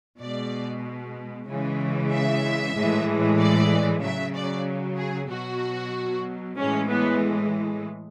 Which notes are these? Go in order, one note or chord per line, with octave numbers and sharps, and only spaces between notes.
B2 G#3 D5
C#3 E3 G#3
E5
A2 E3 G#3
D5
C#3 F#3 E5
D5
G#4
B2 F#3 F#4
A2 E3 G#3 C#4
B3